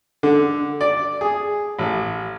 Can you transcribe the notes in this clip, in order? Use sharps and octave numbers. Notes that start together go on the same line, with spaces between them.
D3
D5
G#4
A1